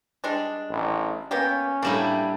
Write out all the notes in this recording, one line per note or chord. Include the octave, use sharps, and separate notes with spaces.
G3 G#3 D4
A1
A#3 B3 C#4 G4
A2 G3 A#3 D4 E4